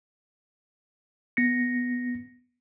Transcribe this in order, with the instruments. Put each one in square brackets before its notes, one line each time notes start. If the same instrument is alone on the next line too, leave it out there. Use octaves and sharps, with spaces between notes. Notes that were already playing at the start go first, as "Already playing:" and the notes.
[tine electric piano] B3 A#6 C#7